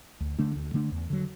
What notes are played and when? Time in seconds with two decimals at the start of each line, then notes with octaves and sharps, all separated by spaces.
0.20 D2
0.38 D3 A3 D4
0.56 D2
0.74 D3 A3 D4
0.92 E2
1.10 D3 F#3